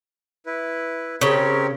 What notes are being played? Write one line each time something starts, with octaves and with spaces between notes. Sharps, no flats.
E4 B4
C#3 C4 G4 A#4 C#5